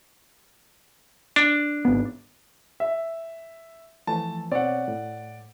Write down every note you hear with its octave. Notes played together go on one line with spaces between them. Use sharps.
D4
G#1 B3
E5
E3 F3 A3 A5
B2 C4 C#5 D5 F#5
A2